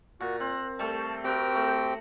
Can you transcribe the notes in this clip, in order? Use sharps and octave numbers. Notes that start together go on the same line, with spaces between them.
A#2 F#4
C4 F#6
G3 A3 A5
C4 F#4 G4 A#4 G5
A3